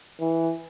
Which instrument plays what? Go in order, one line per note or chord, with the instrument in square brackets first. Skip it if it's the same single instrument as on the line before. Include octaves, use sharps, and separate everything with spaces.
[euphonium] E3